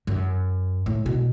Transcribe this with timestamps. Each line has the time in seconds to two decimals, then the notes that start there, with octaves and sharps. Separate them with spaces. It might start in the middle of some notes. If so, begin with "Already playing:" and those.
0.07 F#2
0.86 A2
1.06 B2